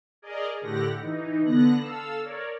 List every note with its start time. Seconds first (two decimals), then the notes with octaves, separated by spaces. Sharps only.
0.22 G#4 A#4 D5 D#5
0.61 A2 D3 G4 F#5 A#6
1.00 E3 D#4
1.42 D3 B3 F#6 A#6
1.80 A4 F5 E6
2.22 A#4 C#5 D5